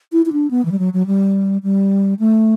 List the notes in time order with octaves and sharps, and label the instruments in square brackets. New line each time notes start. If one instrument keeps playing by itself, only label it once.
[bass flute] E4
E4
D4
B3
E3
G3
F#3
F#3
G3
G3
A3